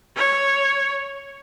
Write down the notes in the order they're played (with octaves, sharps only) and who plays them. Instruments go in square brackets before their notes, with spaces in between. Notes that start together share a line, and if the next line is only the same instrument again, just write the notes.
[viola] C#5